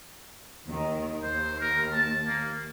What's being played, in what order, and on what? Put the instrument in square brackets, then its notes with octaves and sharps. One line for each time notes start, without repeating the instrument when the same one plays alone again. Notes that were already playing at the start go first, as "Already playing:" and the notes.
[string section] D#2 D#3
[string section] D#2 [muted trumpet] C5
[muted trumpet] A#4
A5
A#3